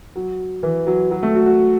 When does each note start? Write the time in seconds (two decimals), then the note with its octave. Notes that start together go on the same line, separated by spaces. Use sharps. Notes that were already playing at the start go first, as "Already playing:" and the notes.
0.16 F#3
0.63 E3
0.87 F#3
1.11 F#3
1.23 A3
1.35 F#4
1.46 F#4